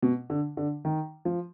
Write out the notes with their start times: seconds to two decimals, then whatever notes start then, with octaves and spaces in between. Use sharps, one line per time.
0.02 B2
0.30 D3
0.57 D3
0.85 D#3
1.25 F3